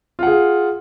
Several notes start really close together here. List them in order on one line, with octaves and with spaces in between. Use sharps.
F4 F#5 G#4